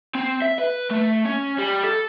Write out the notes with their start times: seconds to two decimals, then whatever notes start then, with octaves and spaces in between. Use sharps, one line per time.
0.15 C4
0.42 E5
0.58 B4
0.91 A3
1.26 C#4
1.59 G3
1.83 A4